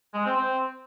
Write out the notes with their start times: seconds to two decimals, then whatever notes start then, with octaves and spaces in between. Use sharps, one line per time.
0.14 G#3
0.25 C4
0.37 C4